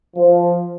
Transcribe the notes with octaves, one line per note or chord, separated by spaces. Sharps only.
F3